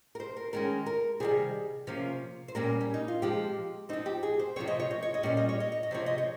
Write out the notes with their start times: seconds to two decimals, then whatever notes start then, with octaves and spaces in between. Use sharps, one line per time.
0.15 A#4
0.20 C5
0.37 A#4
0.53 D#3 G#3 C#4 A#4
0.86 A#4
1.20 C3 D#3 G3 G#4
1.87 C3 F3 A#3 C#4
2.48 C5
2.55 A#2 G3 A#3 C#4 A#4
2.81 C#4
2.94 D#4
3.08 F4
3.22 F3 G#3 C4 G4
3.89 F3 C4 D#4
4.06 G4
4.23 G#4
4.39 C5
4.56 C3 F3 C4 C#5
4.68 D#5
4.80 C#5
4.91 D#5
5.03 C#5
5.14 D#5
5.23 A#2 G3 C#4 C#5
5.37 D#5
5.49 C#5
5.60 D#5
5.72 C#5
5.83 D#5
5.91 C3 F3 C4 C#5
6.06 D#5
6.18 C#5